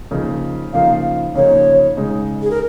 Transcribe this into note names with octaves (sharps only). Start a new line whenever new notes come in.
C#3 F3 A#3 D#4
C#3 F3 A#3 D#4 F5
C#3 F3 A#3 D#4 C#5
C#3 G#3 D#4
G#4
A#4